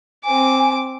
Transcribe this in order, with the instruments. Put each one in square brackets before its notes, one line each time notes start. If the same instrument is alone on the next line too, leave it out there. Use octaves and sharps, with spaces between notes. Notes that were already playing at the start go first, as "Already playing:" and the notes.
[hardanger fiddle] C4 D6 [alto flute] G#5